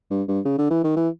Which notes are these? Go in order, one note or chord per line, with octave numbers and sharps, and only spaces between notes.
G2
G2
C#3
D3
E3
D#3
E3